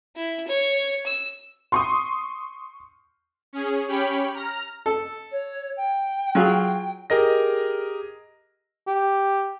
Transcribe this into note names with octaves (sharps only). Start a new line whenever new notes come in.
E4
C#5
E6
C6 C#6 D#6
C#4 G#4
C#4 G4 C#5 G5 B5
A#5 F6
A4
C#5
G5
F#3 F4 G#4
G4 G#4 A#4 D#5 A#6
G4